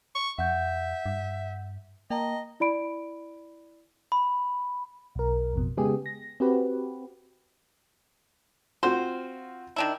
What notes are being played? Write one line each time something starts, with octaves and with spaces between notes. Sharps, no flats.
C#6
F2 E5 F#5 G6
G2
A#3 D#5 G5 A5 A#5
E4 D5 B5 D7
B5
B1 A#4
A1 F2 B2
C#3 G#3 B3 G4 G#4
A#6
C4 F#4 G4 B4
C4 F4 F#4 C5
D#3 D4 E4